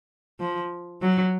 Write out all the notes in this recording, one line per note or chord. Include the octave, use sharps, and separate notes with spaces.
F3
F#3